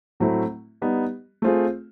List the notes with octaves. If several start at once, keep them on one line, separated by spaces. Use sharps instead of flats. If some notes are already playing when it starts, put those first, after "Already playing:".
A2 F#3 A3 C4 E4
G3 B3 D#4
A3 C4 F4 G#4